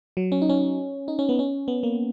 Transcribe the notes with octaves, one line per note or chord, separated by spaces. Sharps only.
F#3
C#4
D#4
C#4
D#4
C#4
B3
C#4
B3
A#3